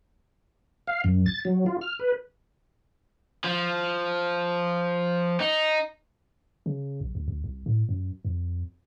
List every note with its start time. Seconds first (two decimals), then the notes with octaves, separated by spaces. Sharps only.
0.88 F5
1.04 F#2
1.26 A6
1.45 F#3
1.66 F4
1.81 F6
1.99 B4
3.44 F3
5.40 D#4
6.66 C#3
7.00 B1
7.15 D2
7.28 D2
7.44 C2
7.66 A2
7.89 F#2
8.25 F2